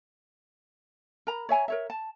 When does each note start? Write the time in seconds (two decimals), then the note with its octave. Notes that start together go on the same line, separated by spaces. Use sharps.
1.27 A#4 A#5 B5
1.49 C#5 E5 G#5 A#5
1.68 A#4 C#5 E5
1.90 A5